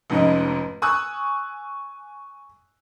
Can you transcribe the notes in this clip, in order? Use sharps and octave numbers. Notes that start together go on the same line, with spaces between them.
F1 F2 G#2 C#4 D#5
G#5 C#6 D#6 E6 F#6